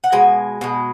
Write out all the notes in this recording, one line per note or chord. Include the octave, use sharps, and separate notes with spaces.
F#5
B2 G#3 G#5
B2 G#3